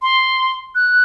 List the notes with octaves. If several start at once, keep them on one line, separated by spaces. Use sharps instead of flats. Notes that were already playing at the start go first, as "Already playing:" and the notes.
C6
F#6